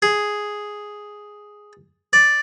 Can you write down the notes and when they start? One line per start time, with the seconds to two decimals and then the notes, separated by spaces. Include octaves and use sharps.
0.02 G#4
2.13 D5